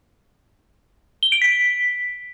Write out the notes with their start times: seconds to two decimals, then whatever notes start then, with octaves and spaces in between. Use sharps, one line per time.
1.23 G7
1.32 D7
1.42 B6